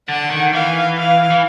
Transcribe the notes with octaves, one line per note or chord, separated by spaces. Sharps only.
D3 F#5
D#3
E3 F5
F5
E3